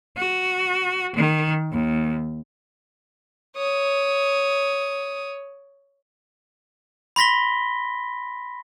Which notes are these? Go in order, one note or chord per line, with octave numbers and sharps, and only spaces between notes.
F#4
D#3
D#2
C#5 D#6
B5 C6 A#6 B6 G7